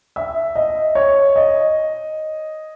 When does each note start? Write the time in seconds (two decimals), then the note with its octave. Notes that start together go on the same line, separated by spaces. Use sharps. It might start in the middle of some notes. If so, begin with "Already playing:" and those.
0.16 E5
0.55 D#5
0.95 C#5
1.36 D#5